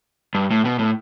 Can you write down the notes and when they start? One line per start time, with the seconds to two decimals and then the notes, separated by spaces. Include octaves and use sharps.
0.35 G2
0.51 A2
0.65 B2
0.79 A2